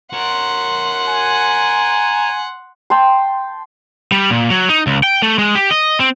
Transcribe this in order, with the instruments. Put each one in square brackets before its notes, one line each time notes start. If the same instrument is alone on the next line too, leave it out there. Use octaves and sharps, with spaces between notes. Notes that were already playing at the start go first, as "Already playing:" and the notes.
[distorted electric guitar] A#4 C#5 [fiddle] F#5 C6
[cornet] G#5
[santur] G5 A5 C6
[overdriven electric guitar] G3
A#2
F#3
D#4
C#2
G5
A3
G#3
G4
D#5
C4